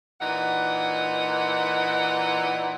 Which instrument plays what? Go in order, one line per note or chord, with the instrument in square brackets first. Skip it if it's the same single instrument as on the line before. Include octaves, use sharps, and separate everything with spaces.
[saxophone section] A#2 E3 D#4 F#5